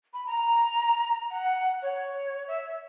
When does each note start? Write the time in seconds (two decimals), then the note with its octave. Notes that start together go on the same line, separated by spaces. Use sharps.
0.13 B5
0.26 A#5
1.30 F#5
1.82 C#5
2.48 E5